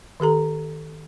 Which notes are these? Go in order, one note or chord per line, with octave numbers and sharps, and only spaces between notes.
D#3 G4 A4 A#5